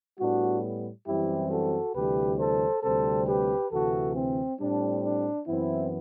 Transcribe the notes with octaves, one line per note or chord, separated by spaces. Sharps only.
A2 G3 B3 D4 F#4
F#2 E3 G3 C4 E4 G4
F#4 A4
D2 C3 E3 G3 G4 B4
A4 C5
D2 C3 G3 C4 A4 C5
G4 B4
D2 C3 E3 F#4 A4
C4
A2 G3 C4 D4
D4
F#2 E3 B3 C4 E4